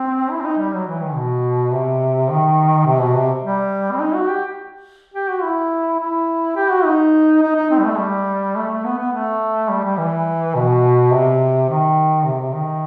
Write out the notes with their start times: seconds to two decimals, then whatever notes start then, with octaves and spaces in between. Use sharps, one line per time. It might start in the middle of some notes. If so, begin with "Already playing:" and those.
Already playing: C4
0.31 E4
0.41 C4
0.45 D#4
0.59 G3
0.74 F#3
0.87 E3
1.02 D#3
1.16 B2
1.73 C3
2.30 D#3
2.87 C3
3.01 B2
3.15 C3
3.43 G3
3.92 C4
4.01 D#4
4.15 F#4
4.29 G4
5.14 G4
5.29 F#4
5.43 E4
5.99 E4
6.56 G4
6.71 F#4
6.85 D#4
7.42 D#4
7.56 D#4
7.71 C4
7.79 G3
7.85 A3
7.98 G3
8.56 A3
8.71 A3
8.85 B3
8.98 B3
9.13 A3
9.69 G3
9.84 G3
9.98 E3
10.55 B2
11.12 C3
11.69 D#3
12.26 C3
12.41 C3
12.54 D#3